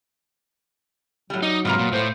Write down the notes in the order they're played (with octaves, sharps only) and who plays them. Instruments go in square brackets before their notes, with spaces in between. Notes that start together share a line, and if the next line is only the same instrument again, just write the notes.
[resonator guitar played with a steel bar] A2 G3 [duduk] F#3
[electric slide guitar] D#4 [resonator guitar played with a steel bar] D5
[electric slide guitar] G#2 C3 [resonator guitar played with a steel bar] B3 F4 A#5
[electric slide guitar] A#2
[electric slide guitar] A2 A3 [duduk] C5